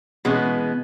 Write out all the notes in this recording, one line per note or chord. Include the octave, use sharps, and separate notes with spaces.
B2 E3 G#3 B3 C#4